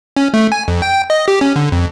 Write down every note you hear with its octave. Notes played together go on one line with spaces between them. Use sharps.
C#4
A3
G#5
F2
G5
D#5
G4
C#4
D3
F2